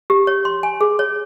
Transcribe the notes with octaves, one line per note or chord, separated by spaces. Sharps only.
G4
C#5
C6
G#5
G#4
C#5